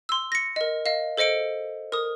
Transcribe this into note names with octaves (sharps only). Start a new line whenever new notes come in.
C6 E6
A#6 C#7
A#4 D#5
D#5 F5
A4 C5 D#5 C#7 D7
A#4 D#6